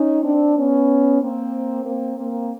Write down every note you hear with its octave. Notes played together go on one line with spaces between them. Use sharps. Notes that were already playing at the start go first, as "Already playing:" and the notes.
Already playing: C#4 D#4
C4 D4
B3 C#4
A#3 C4
A#3 C4
A#3 C4